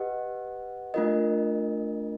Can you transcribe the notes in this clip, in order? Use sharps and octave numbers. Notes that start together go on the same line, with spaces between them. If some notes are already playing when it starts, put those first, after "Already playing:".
Already playing: G4 B4 D#5 F#5
A3 D4 F4 A#4 D#5